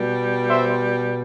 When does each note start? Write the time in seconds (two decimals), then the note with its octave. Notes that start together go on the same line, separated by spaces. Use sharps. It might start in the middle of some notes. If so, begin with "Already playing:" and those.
Already playing: B2 G3
0.50 C5 E5